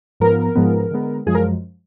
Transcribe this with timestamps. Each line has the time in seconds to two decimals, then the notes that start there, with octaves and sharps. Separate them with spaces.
0.20 G#2 F3 B3 A#4
0.55 G#2 F3 G#3 B3
0.91 D3 G#3 B3
1.26 F#2 F3 G#3 G#4
1.35 A#4